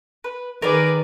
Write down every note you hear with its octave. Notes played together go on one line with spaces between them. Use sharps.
B4
D#3 G#4 A#4 B4 D5